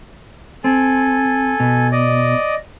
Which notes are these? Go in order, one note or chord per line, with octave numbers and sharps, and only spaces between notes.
C4 A4 G#5
B2
D5 D#5